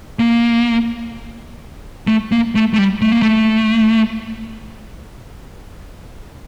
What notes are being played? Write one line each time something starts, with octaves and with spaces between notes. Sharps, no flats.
A#3
A3
A#3
A3
A3
G3
A3
A#3
A3